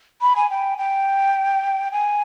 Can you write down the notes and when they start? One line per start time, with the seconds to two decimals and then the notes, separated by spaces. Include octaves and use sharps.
0.21 B5
0.36 G#5
0.50 G5
0.78 G5
1.92 G#5